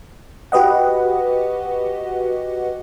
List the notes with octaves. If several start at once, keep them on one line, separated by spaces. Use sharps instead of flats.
F#4 G4 B4 D#5 F#5